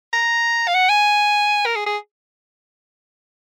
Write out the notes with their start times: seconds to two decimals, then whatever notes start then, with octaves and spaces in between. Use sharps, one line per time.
0.13 A#5
0.68 F5
0.74 F#5
0.89 G#5
1.66 A#4
1.76 G#4
1.86 G#4